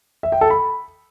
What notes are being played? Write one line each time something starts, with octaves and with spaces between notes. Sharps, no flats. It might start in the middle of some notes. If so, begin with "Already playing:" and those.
E5
G5
A4
B5